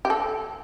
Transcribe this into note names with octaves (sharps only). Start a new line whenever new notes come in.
G4
A4